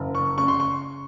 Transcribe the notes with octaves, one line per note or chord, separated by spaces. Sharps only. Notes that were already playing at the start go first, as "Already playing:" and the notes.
Already playing: F#1
C#6
C#3 C#6
C6
C#6